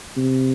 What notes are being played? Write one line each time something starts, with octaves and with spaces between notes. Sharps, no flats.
C3